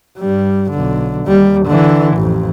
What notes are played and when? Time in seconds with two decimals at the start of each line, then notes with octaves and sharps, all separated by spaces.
0.18 G2 G3
0.71 B1 D3
1.27 D#2 G3
1.66 D3 E3
2.17 A1 F2